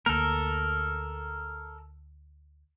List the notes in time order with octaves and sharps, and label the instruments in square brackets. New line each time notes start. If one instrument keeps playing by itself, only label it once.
[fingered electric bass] D2 A#3 [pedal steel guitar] A4 A#4